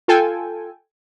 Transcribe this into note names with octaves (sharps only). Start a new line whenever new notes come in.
F4 A4 G5 G#5